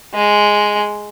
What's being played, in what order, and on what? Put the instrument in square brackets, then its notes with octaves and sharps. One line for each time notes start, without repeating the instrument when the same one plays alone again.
[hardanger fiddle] G#3